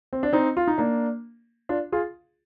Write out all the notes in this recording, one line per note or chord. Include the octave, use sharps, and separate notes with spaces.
C4
D4
C4 D#4
F4
D#4
A#3 D4
D4 F4
F4 G#4